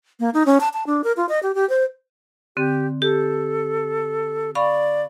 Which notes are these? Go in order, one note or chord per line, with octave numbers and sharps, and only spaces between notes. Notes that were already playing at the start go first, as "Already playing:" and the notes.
A#3
D#4
C#4
A5
A5
D4
A#4
F4
D#5
G4
G4
C5
D3 C4 G4
G4 A4
D5 F5 B5 C#6